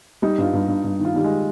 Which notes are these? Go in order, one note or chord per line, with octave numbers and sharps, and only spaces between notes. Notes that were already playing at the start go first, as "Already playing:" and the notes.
G3 D#4
G2 F4
G2
G2
G2
D#3
F4
D#3 G3
G#3